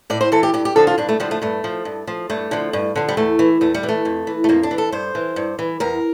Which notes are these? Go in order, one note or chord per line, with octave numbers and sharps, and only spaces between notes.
A2 D5
C5
E3 A4
G4
G2 G4
G4
D3 F3 A4
F4
G2 D4
A3
D3 F3 G3
A3
G2 A3
F3
G2
F3
G2 A3
D3 F3
G2
D3 F3
G3
E2 A3
E3
E2 A3
G3
E3
A3
F2
E3
A3
F2 A#3
D4
E3
A4
G2 C5
E3
G2
E3
E2 A#4